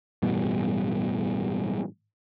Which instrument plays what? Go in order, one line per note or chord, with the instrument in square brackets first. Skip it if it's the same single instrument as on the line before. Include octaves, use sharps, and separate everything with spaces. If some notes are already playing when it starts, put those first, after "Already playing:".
[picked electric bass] A1 G2 B2